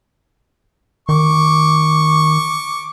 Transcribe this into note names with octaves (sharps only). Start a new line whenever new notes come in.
D#3 C#6 D6